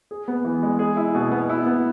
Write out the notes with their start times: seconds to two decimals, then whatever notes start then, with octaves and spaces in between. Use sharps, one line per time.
0.11 G#4
0.28 B3
0.44 E3
0.63 G#3
0.79 G#4
0.97 E4
1.15 B2
1.32 B3
1.49 E4
1.66 B3